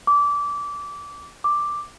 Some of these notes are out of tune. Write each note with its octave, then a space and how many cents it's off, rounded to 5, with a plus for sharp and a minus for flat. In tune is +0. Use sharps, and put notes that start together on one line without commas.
D6 -20
D6 +5